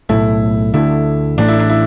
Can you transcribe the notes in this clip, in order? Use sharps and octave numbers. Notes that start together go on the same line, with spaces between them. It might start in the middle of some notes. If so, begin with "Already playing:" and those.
B1 A2 A3 E4
D2 D3 A3 E4
A1 A2 A3 D4
E4
D4
E4